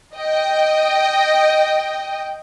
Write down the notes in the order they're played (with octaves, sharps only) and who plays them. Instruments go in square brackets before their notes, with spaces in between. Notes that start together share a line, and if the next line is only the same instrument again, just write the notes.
[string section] D#5 G5